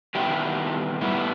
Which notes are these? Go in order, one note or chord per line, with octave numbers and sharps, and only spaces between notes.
F#2 D#3 G3 B3 E4 G4
A2 G3 B3 E4